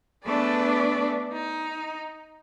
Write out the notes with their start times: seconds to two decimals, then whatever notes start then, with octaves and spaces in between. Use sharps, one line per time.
0.24 A3 B3 D4 G#4 B4 D5
1.32 D#4